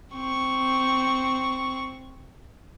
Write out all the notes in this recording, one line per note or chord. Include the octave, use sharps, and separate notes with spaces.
C4 C#6